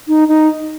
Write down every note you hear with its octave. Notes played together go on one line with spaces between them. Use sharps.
D#4
D#4